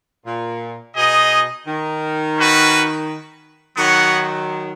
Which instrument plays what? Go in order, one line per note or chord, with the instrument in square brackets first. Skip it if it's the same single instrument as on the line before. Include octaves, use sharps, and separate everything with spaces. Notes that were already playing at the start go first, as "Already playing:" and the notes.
[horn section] A#2
[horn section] B2 [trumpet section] D#4 G#4 D#5
[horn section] D#3
[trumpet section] C#4 F#4 B4
[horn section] D#3 F#3 [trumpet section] B3 F#4 C#5 F#5